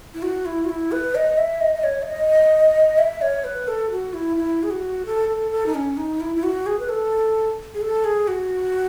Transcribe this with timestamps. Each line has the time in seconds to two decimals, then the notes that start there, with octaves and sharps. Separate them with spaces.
0.14 E4
0.22 F#4
0.46 E4
0.65 F#4
0.69 E4
0.92 B4
1.15 D#5
1.38 E5
1.61 D#5
1.75 D#5
1.84 C#5
2.03 E5
2.06 D#5
2.98 E5
3.21 C#5
3.44 B4
3.68 A4
3.91 F#4
4.14 E4
4.37 E4
4.63 G#4
4.71 F#4
5.06 A4
5.29 A4
5.51 A4
5.66 D#4
5.74 C#4
5.97 D#4
6.20 E4
6.36 E4
6.43 F#4
6.66 G#4
6.80 B4
6.89 A4
7.74 G#4
7.81 A4
8.04 G#4
8.28 F#4